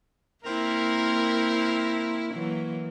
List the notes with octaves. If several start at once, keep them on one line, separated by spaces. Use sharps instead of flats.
A#3 C4 E4 A#4
E3 F#3 A#3